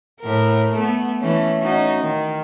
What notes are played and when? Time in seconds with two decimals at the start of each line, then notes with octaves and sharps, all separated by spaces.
0.21 A2 A#4
0.75 A3 B3
1.20 E3 A3 C#4
1.61 C#4 D#4 F#4
2.02 D#3